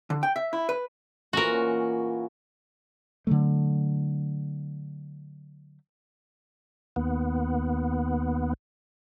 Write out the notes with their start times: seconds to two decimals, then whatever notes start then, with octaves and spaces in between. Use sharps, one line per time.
0.10 D3
0.23 G5
0.36 E5
0.53 E4
0.69 B4
1.33 A#2 E3 F#4 A#4 C5
1.53 C#4
3.27 D3 E3 F#3 A3
6.96 D#2 B3